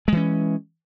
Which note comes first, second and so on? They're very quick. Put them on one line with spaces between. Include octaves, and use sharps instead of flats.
G#3 E3 C#4